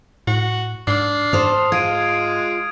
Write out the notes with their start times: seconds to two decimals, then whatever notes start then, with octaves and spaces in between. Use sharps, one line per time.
0.27 A2 F#4
0.87 G#2 D4 F6 C7
1.33 G#2 A4 C5 D#6 F7
1.72 G#3 F4 G#6 D7 D#7